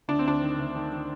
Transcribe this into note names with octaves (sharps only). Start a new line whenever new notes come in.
D2 D4
C4
D2 D4
D#3
D2
D#3
D#3